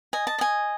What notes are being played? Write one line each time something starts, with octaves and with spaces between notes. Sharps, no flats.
D#5 G#5
A5
D#5 G#5